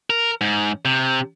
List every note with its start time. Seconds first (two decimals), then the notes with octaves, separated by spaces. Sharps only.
0.10 A#4
0.41 G#2
0.85 C3